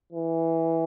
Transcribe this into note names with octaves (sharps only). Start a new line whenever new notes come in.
E3